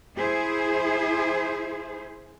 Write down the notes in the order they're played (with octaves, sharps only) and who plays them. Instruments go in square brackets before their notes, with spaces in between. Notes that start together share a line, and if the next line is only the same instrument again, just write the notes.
[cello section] E4 G#4 C5